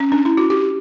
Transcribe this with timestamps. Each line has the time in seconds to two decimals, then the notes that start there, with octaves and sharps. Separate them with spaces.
0.00 C#4
0.12 D4
0.25 E4
0.37 F#4
0.50 G4